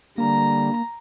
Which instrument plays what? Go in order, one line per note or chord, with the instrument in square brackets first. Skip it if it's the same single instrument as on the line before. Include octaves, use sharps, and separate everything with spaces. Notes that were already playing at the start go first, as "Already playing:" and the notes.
[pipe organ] D3 G3 [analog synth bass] A#3 [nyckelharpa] A#5